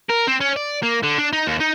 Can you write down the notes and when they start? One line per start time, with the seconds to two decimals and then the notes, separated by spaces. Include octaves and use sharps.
0.10 A#4
0.28 C4
0.41 C#4
0.56 D5
0.83 A#3
1.03 D3
1.18 D4
1.33 D#4
1.47 D#2
1.60 D#4